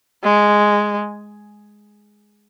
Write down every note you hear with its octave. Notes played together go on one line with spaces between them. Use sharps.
G#3